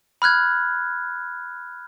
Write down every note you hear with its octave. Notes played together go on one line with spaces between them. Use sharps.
B5 F6 F#6 G#6